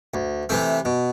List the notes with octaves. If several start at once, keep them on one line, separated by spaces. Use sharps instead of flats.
D2
C3 E3 A3 C4
B2